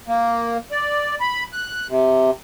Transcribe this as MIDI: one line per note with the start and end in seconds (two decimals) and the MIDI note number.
0.08 0.57 58
0.72 1.15 74
1.21 1.44 83
1.53 1.87 90
1.89 2.31 48